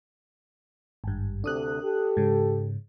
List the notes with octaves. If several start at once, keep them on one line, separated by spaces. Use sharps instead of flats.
G#1 G2
D2 C3 D4 A4 D#6 F#6
G4 A4
G#2 C#3